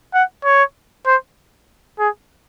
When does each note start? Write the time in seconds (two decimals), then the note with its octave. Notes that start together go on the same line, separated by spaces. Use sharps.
0.14 F#5
0.45 C#5
1.06 C5
1.99 G#4